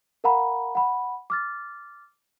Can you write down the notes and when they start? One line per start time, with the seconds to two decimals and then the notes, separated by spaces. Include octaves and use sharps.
0.24 A#4 F5 F#5 A#5 B5
0.75 F#5 B5
1.30 D6 F6 A6